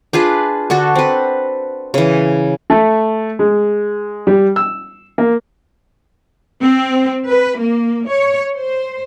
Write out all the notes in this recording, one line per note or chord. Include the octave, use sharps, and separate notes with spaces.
D4 F4 G#4 B4
D3 D4 F#4 A4
C4 B4
C#3 E3
A3
G#3
G3
E6
A#3
C4
B4
A#3
C#5
C5